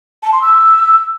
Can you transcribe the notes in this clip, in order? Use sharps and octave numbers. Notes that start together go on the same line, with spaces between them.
A5
C6
E6